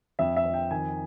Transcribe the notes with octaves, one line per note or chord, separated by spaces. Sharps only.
F2 E5
E5
F2
G5
D#3 G#5